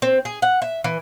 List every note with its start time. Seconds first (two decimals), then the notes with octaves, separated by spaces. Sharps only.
0.02 C4
0.25 G#4
0.42 F#5
0.62 E5
0.84 E3